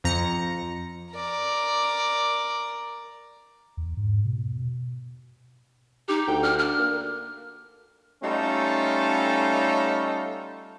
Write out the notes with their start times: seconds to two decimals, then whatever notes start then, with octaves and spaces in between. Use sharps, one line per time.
0.04 F2 A#5 A#6 C#7
1.14 A#4 D5
3.77 E2
3.97 G#2
4.25 B2
6.09 D#4 G4
6.28 D2 G5
6.43 D4 F6
6.58 F6
6.79 A#3
8.23 G3 A3 C#4 D#4 F4 A4